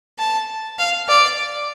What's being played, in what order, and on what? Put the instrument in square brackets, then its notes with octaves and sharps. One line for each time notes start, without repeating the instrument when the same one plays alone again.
[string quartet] A5
F5
D5